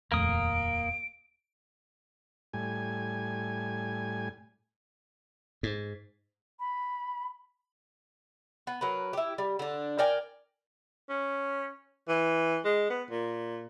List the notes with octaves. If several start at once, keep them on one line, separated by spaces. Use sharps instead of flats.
D#1 F2 A3 A#3 D#6 D7
A2 G3 G#5
G#2
B5
B3
F#3 A#4 B4
E4 G4
G3
D3 D4
A#4 D5 G5 G#5
C#4
E3
G#3
B3
A#2